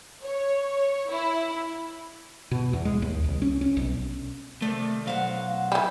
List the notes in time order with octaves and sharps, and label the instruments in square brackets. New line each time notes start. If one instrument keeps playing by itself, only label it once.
[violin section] C#5
E4
[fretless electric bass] B2
E2
G#3
D#2
C2
C#4
C#4
B1
[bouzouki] C3 D#3 D5 [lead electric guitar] A3
[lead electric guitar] B1 F5 [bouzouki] F#3 C5 F#5
[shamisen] E3 G3